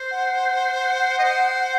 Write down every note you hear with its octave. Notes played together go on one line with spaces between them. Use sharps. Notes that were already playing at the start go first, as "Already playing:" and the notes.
Already playing: C5
F#5
D#5
C5